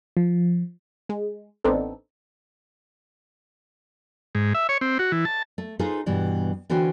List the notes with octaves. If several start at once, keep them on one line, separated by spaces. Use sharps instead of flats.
F3
G#3
A1 B3 C4 D4 D#4 A4
G#2
E5
C#5
C4
F#4
E3
A5
A3
D#4 F4 G#4 A4 B4 C5
G2 B2 E3 G3
D3 E3 C#4 F#4 C5 G5